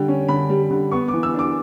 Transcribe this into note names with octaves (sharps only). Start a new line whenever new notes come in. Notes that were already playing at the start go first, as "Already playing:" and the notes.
Already playing: D3 G3 G5
C#4
D3 B5
G3
D3
B3 C#6
D6
E3
E6
D4 D6